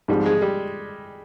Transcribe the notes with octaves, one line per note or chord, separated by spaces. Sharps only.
G#2 F3 G3 C4 F4 G#4
G#3
G3